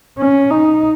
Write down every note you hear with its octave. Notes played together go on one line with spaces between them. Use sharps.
C#4
D#4